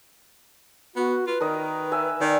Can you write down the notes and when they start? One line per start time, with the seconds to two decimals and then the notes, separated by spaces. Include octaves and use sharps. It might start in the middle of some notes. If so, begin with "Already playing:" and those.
0.96 B3 F#4
1.27 F4 B4
1.41 D#3 A#4 D#5
1.92 E5 G#5
2.21 D#3 D5